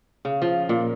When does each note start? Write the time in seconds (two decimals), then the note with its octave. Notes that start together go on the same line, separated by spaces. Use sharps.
0.25 C#3
0.42 F3
0.69 A#2